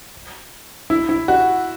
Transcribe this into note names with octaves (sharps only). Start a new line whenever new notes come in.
E4
E4
F#4